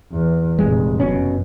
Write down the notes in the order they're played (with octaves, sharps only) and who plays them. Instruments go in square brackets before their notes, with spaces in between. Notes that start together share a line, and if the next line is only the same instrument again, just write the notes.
[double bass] E2
[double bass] F1 A#2 [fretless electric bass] G#3
[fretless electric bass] F#1 B2 C#4 [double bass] F#2